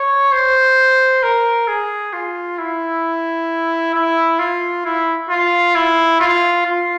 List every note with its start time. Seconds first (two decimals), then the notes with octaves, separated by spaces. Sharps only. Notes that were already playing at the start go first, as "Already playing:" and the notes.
Already playing: C#5
0.32 C5
1.23 A#4
1.68 G#4
2.13 F4
2.58 E4
3.94 E4
4.39 F4
4.85 E4
5.30 F4
5.75 E4
6.20 F4
6.66 F4